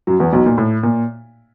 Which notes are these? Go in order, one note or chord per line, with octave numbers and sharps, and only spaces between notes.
F#2 F#3
E2 E3
B1 B2
A#2
A2
A#2